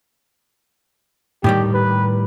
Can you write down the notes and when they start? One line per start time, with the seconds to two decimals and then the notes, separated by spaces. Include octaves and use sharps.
1.44 A2 D#3 G3 G4
1.73 B4